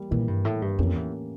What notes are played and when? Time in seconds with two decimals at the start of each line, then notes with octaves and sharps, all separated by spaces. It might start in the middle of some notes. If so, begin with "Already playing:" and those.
Already playing: E3 G3 A#3
0.11 A#2 E3 G3 A#3
0.28 G2
0.45 A2
0.62 G2
0.79 F2 A2 E3 A#3 C#4 G4
0.95 E2